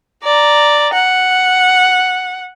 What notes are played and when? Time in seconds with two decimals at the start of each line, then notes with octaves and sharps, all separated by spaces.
0.24 D5 A#5
0.94 F#5